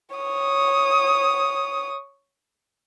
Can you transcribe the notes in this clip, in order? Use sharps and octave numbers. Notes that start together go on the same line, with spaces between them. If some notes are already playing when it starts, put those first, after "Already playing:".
C#5 D#6